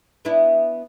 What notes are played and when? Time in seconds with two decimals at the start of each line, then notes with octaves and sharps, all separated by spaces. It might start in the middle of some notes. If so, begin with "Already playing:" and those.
0.25 B3 D4 E4